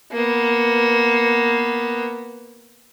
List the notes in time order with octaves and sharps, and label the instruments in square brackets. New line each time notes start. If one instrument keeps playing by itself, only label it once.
[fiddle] A#3 B3